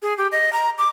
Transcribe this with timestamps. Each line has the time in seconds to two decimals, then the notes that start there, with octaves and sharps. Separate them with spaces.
0.02 G#4
0.18 G4
0.32 D#5
0.53 A#5
0.78 D6